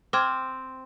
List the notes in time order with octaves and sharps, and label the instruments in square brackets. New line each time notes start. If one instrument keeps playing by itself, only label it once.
[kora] C4 [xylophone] D6 F6 G#6